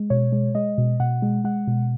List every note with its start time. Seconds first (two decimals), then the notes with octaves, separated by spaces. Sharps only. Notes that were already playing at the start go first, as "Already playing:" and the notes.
Already playing: G#3
0.10 B2 C#5
0.32 G#3
0.55 G#3 D#5
0.78 B2
1.00 B2 F#5
1.22 G#3
1.44 G#3 F#5
1.67 B2